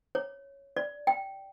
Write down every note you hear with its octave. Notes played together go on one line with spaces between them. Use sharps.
C#5
D5
G5